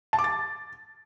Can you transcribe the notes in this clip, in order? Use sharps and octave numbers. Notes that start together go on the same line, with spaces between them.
A5
D6
A6